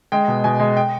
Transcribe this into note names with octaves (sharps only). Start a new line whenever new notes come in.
G#3 G5
B2
B2 G#5
G#3
G5